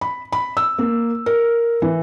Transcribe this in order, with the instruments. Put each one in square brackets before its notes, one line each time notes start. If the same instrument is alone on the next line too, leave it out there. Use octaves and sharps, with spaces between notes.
[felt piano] B5
B5
E6
A#3
A#4
E3